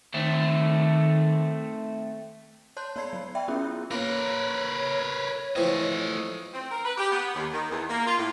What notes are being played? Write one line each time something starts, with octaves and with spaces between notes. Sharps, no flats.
D#3 A3 C4
C#5 A5 C6 F#6 G6
B3 C#5 D5 B5 G#6 C7
F#3
D5 E5 G5 B5
B3 C#4 E4 F4 G#4
A#3 A#4 B4 C#5
E3 F3 A3 C4 D#5
C4
A#4
B4
G4
B3
D#2
D#3
E2
A#3
F4
A2